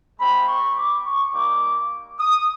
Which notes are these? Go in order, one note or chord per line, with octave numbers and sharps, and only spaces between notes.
G#3 C4 F4 B5
C#6
D6
C#6
G3 A#3 D#4 D6
D#6